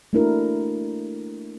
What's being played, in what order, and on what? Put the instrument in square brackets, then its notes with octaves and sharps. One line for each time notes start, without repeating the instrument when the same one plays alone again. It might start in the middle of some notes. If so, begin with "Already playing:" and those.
[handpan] A3 A#3 D4 E4 F#4 A#4